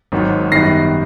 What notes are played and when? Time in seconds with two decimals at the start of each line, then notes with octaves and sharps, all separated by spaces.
0.12 G#1 G#2 D#3 F#3
0.52 F#2 D#3 G3 B3 D#4 A#6 C7